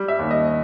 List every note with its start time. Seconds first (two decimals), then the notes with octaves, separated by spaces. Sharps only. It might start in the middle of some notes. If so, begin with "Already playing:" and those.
Already playing: G3
0.08 E5
0.19 D#2
0.31 D#5